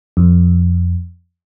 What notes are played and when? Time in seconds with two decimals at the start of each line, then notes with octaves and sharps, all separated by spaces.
0.17 F2